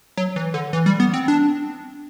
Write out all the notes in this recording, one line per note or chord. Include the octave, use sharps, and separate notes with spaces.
F#3
E3
D3
E3
G3
B3
C4
D4